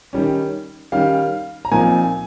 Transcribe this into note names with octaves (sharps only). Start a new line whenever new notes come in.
D#3 G3 C#4
D#3 G3 C#4 F5
A#5
A#2 F3 C4 D#4 G#5